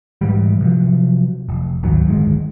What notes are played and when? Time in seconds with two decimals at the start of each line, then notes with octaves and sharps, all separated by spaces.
0.21 G#2 E3 G3
0.61 C3 F3 F#3
1.49 F1
1.83 G#1 D2 D#3 F#3
2.06 D1 G1 D#3 G#3